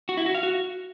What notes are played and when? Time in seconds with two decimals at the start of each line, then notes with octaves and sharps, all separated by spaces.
0.09 F#4
0.17 E4
0.26 F#4
0.35 F5
0.43 F#4